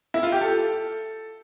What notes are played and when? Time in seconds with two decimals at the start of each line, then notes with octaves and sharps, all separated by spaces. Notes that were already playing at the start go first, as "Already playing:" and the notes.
0.14 E4
0.23 F4
0.32 G4
0.41 A4